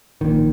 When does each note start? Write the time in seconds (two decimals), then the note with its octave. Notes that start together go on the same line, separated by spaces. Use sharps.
0.21 A#1 A#2 D#3